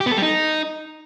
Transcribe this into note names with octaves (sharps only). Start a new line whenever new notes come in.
G4
B3
A4
G3
D#4